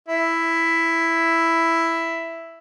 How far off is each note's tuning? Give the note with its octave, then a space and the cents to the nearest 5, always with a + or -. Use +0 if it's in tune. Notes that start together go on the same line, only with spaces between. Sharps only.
E4 +5